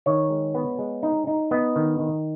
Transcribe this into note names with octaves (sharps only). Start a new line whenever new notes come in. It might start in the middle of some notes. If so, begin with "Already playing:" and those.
D#3 C#5
G#3
B3
G#3
D#4
D#4
B3 D#5
D#3
D#3